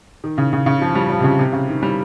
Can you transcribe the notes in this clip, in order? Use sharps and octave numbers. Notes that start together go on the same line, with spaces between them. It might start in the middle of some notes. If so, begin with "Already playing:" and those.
D#3
C#3
C#3
C#3
F3
G3
F3
C3
C#3
C3
C#3
D#3
G3